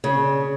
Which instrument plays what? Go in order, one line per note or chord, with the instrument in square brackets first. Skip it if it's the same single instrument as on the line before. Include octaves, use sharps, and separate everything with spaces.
[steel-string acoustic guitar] C#3